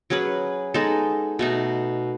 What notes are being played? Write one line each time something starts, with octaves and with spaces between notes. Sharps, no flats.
F#3 C#4 G#4 B4
G#3 B3 D#4 A4
B2 A3 D#4